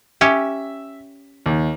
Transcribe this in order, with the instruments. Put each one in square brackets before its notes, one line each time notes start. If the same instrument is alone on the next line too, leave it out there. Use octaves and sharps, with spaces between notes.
[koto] C#4 G4 [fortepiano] E5
[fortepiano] D#2